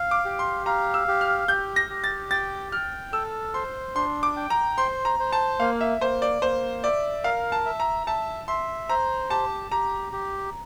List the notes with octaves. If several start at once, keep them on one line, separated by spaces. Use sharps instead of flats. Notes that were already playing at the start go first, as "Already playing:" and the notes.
Already playing: F5
D6
G4
C6
F5 A#5
E6
G4
F6
G4 G6
A#6
G4
A6
G5 A6
G5 F6
A4 E6
C5 C6
D4 C6
D6
G5
A#5
C5 C6
A#5
C5
A5
A#3 F5
E5
A#3 C5
D5
A#3 C5
D5 E5
A#4 F5
A5
E5
A#5
E5 A5
E5 C6
C5 A#5
G4 A5
G4 A#5
G4